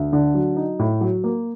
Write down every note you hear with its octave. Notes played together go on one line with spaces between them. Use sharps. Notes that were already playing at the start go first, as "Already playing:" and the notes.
Already playing: D2
D3
F#3
D#4
A2
F#3
A#3